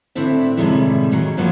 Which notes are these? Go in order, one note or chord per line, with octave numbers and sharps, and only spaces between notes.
A2 D3 C4 D4 E4 E5
A2 C3 D#3 G3 G#3 E4
D#3 F#3 G3 G#4
G2 D#3 F3 F#3 A#3 B3